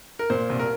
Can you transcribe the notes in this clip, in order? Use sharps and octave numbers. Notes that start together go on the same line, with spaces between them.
A#4
A#2 C5
C2
A#4